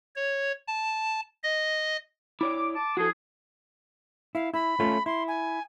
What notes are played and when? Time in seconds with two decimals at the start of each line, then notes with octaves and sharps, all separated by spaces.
0.16 C#5
0.68 A5
1.44 D#5
2.41 E4 C#5 D5 D6
2.75 A5 D6
2.97 F3 E4 F#4 G#4 A4
4.35 E4 F5
4.54 E4 B5
4.80 A3 C#4 F4
5.06 E4 C6
5.28 G#5